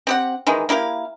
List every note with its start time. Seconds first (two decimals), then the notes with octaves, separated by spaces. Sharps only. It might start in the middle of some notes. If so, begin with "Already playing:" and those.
0.07 C4 G4 F#5
0.47 D#3 E3 G#3
0.69 A#3 E4 G4 F5